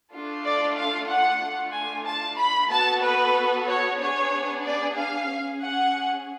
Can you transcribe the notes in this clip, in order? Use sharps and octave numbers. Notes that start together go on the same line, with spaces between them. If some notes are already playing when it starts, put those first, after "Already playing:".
A3 D4 F4 A4
D5
F5
F#5
A3 D4 F4
G#5
A5
B5
B3 F#4 A4 A5
B4
C#5
B3 D4 G#4 C#5
D5
F5
C#4 G#4
F#5